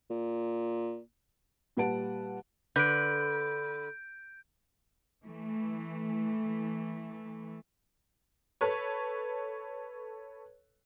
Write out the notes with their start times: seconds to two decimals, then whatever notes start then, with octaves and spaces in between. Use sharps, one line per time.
0.10 A#2
1.77 A#2 G3 B4 F#5 A5 D7
2.76 D3 B4 G6 D7
5.23 E3 A3
8.61 A4 B4 C#5